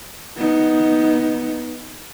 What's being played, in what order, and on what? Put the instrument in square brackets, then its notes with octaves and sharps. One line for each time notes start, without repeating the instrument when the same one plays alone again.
[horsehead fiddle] B3 D#4